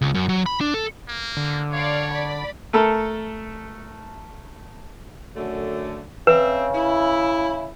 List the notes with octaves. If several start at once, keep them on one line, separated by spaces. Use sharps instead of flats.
C#2
F#2
F#3
B5
D4
A4
A#3
D3
C#5 D5 F5
D5 B5
A3 A4 A#4
F#2 D3 A3
C#3 C4 B4 E5
E4